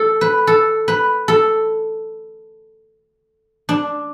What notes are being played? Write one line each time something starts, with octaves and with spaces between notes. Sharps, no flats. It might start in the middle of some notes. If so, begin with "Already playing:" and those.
Already playing: A4
B4
A4
B4
A4
D4